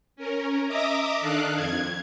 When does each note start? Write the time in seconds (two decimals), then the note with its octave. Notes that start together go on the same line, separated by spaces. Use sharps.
0.16 C#4 A#4
0.67 D#5 E5 A#5 D6 D#6
1.21 D#3 D4 A4 F5 F#6
1.54 F2 G#6